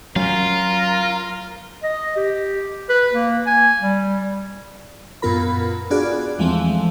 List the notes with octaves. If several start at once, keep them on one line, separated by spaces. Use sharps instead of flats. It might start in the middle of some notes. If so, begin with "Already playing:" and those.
F#3 C#4 F4 A#4
D#5
G4
B4
A#3
G#5
G3
F#2 A#2 B3 F4 A#4 B5
B3 D4 F4 F#4 G#4 D5
E2 E3 F3 G#3 A3 C4